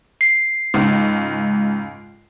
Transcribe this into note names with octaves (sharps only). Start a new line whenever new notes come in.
C7
C#2 G#2